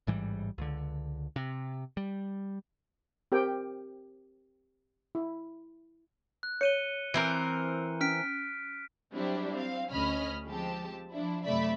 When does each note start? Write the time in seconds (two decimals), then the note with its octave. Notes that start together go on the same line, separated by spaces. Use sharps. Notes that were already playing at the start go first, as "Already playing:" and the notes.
0.07 A1 G#2 E3 G3
0.58 C#2 D3
1.36 C3
1.97 G3
3.32 C4 G4 A#4 G5
5.15 E4
6.43 F#6
6.61 C#5 C#7 D#7 G7
7.14 E3 C4 A#4
8.01 C#4 F6 B6 D7
9.13 F#3 G3 C4 D4 E4 G4
9.53 C4 F5
9.92 D2 C#4 D#5 B5 F6
10.48 F3 G#3 C4 G4 A5
11.12 F3 D4 E4
11.44 F#2 C3 A3 D5 E5 B5